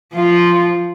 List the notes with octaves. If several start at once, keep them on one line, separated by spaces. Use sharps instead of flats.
F3 F4